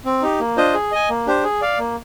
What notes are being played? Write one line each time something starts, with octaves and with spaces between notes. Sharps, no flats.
C4
D#4 G4
A#3
D4 F4 C5 D#5
G#4
D#5 G#5
A#3
D4 G4 C5
G#4
D5 F5
A#3